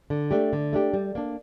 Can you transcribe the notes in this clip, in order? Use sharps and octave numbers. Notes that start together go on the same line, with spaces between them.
D3
A3 D4 G4
D3
A3 D4 G4
G3
A#3 D4